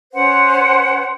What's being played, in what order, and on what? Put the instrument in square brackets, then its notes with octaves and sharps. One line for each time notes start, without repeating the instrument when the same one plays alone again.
[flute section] C#4 B4 C5 F#5